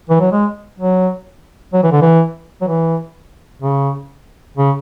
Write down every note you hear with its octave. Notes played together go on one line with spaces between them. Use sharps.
E3
F#3
G#3
F#3
F#3
E3
D3
E3
F#3
E3
C#3
C#3